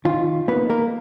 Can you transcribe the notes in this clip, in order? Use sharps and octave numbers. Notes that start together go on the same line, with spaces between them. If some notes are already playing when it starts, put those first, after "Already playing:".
D#3 F4
A#3 B3 D#4 B4
A#3 A#4